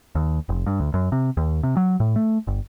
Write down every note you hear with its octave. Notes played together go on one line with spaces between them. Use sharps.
D#2
F1
G2
D2
F#2
C3
D#2
C3
F#3
A2
A3
G1